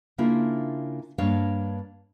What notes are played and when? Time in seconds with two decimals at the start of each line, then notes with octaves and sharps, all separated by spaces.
0.18 C#3 A#3 D4 E4 F4 A#4
1.18 G2 A#3 D4 C#5 F5